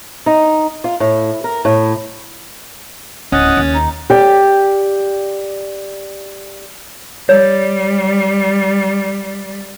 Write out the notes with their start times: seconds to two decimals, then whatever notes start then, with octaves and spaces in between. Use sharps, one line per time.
0.26 D#4
0.84 F4
1.00 A2
1.44 A#4
1.65 A2
3.32 D1 C#4 D#5 F#5 A6
3.57 D#2
3.74 D#4
4.10 G4 D5
7.29 G3 C#5